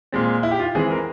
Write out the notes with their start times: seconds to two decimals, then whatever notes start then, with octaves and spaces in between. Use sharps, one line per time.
0.12 A#2 G#3 C4
0.43 E4
0.51 G4
0.59 F4
0.75 E3 G#3 C4 G#4
0.91 A#4